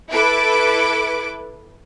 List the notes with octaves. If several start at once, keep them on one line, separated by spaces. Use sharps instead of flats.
E4 A4 B4 D6 D7